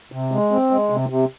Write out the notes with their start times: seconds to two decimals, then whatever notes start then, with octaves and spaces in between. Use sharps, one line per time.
0.12 C3
0.32 G#3
0.51 C4
0.71 G#3
0.90 C3
1.09 C3